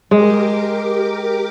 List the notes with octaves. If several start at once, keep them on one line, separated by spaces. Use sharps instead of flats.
G#3 G4 A#4 D6